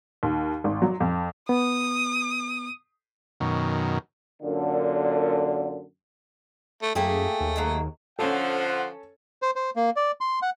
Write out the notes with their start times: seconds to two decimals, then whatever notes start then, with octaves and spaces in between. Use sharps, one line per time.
0.23 D#2
0.64 G#1
0.82 F#3
1.00 F2
1.49 B3 D#6
3.40 F#2 B2 D#3
4.43 F#2 A#2 D3
6.82 A3
6.95 F#2 A3 A#3 G4 G#4
7.40 D#2
7.56 F#3 G#3 A#3
8.19 D3 F3 C#4 A4 C5 F#5
9.42 C5
9.56 C5
9.76 A#3
9.96 D5
10.21 C6
10.42 F#5